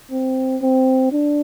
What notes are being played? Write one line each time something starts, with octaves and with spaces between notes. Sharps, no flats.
C4
C4
D4